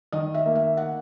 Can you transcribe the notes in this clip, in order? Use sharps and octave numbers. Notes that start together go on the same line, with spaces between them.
D#3 D#5
E5
A#3
E5
F#5